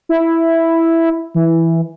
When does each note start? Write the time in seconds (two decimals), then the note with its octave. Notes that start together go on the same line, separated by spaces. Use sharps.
0.09 E4
1.35 E3